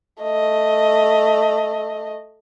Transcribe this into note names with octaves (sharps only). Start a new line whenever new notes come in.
A3 D#5